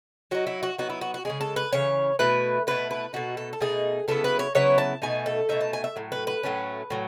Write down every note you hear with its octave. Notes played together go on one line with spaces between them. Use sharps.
F#3 B3 D#4 F#4
E4
F#4
F#3 B3 D#4 F#4
E4
F#4
F#4
C#3 E3 G#3 G#4
A4
B4
C#3 E3 C#5
B2 A3 E4 B4
B2 A3 E4 B4
B4
B2 A3 D#4 F#4
A4
A4
B2 A3 D#4 G#4
C#3 F#3 B3 E4 A4
B4
C#5
C#3 F#3 B3 E4 C#5
A5
B2 A3 D#4 G#5
A4
B2 A3 D#4 E5
A5
G#5
E5
A2 F#3
B4
B4
A2 F#3 A3 C#4
A2 F#3